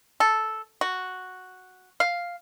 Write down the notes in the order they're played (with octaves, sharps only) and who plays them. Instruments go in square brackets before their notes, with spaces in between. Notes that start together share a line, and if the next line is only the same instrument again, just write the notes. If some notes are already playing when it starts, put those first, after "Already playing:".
[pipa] A4
F#4
F5